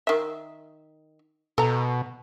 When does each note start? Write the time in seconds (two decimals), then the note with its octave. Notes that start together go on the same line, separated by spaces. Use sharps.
0.07 D#3 E5
1.58 B2 A4 A#5